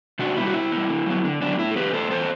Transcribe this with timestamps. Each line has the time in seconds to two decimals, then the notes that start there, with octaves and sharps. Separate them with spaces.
0.19 C3 D4 F#4
0.36 G3 B3 E4
0.46 F#4
0.54 C3 E4
0.72 G3 B3
0.89 D3
1.06 F#3 B3
1.24 D3
1.42 F#3 B3 D4
1.59 A2 E4
1.71 A4
1.76 E3 B3 G4 B4
1.93 A2 A4 C5
2.11 E3 B3 A4 C5